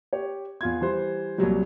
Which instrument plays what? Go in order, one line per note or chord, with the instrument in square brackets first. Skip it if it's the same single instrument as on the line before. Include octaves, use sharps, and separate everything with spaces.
[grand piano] G4 C#5
E2 F4 G#6
E3 G3 C5
C2 A#2 F#3 G3